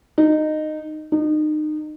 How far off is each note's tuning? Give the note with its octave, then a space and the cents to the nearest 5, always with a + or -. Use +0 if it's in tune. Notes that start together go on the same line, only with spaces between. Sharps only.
D#4 -15
D#4 -30